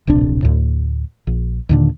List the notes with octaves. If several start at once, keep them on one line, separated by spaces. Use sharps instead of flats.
D1 A#1 C3 D4
D2 A2
A#1
D#2 A#2 D3